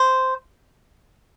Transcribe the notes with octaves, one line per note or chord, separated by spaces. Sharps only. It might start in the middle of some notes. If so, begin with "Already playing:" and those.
Already playing: C5